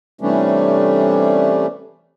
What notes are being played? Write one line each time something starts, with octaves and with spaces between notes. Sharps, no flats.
C3 E3 G3 A3 C#4 D4